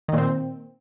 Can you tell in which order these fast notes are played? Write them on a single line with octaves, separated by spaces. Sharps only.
D#3 A#2 C4